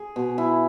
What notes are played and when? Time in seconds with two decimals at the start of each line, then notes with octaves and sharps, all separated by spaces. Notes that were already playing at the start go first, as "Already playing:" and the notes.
Already playing: G#4
0.16 B2
0.38 E4